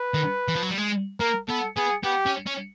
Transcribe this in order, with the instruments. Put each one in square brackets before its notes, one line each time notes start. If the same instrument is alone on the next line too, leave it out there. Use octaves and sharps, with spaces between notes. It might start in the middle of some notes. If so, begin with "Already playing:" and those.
Already playing: [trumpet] B4
[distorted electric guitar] D#3
E3
F3
F#3
G3
G#3
[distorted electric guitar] A#3 [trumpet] A#4
[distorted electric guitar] B3 [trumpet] A4
[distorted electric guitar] B3 [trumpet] G#4
[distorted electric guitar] B3 [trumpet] G4
[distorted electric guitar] C#4
C#4